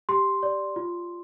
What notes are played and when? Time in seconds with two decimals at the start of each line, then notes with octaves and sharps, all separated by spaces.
0.09 G4 C6
0.43 D5
0.76 F4